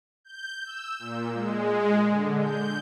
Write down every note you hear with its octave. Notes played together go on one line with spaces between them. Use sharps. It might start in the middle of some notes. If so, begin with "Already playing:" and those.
G6
E6
A#2
G#3
D3
G6